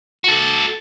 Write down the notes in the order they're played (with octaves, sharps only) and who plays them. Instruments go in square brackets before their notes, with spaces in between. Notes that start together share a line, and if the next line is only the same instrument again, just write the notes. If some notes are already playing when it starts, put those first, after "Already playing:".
[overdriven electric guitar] F#4 A4